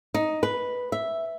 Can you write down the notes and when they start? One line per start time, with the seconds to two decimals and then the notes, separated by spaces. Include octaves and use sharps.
0.14 D#4
0.43 B4
0.92 E5